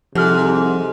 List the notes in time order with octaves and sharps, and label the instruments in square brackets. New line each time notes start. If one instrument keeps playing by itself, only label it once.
[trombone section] C2 C3 [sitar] G#2 [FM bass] F3 [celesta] G4 A4 F6